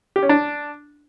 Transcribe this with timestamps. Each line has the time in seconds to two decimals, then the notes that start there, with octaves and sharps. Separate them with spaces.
0.16 G4
0.23 C#4
0.29 D4